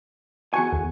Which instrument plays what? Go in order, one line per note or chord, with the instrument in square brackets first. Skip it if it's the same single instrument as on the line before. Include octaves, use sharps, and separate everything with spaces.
[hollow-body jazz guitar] E2 F#4 G#5 [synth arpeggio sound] C#6 C#7
[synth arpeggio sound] D#2